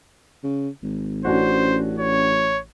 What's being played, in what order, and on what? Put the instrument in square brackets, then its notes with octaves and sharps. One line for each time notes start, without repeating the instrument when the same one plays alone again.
[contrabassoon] C#3
G#1
[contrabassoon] A1 [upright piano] C#4 D4 F#4 [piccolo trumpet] C5
[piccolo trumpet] C#5